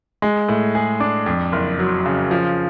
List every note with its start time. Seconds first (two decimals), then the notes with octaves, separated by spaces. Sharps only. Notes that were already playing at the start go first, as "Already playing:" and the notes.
0.22 G#3
0.48 A2
0.75 G#4
1.00 D4
1.26 F2
1.52 F#1
1.79 F#3
2.06 C#3
2.31 F3